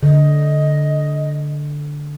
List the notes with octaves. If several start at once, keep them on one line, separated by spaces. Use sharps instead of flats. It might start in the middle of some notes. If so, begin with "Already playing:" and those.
D3 D#5